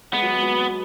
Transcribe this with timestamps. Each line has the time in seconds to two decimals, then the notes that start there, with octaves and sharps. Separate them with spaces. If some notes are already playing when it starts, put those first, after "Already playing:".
0.13 G#3 B3
0.22 F#3
0.32 G#3
0.42 F#3